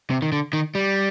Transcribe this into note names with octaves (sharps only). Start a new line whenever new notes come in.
C3
D#3
D3
D#3
G3